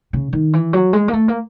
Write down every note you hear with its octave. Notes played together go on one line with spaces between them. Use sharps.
C#3
D#3
E3
F#3
G#3
A#3
A3
A#3